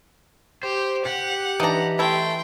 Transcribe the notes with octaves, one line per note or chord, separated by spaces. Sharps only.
G4 C5
G4 F#5
E3 D4 D#4 A#5
A3 E4 G5 C6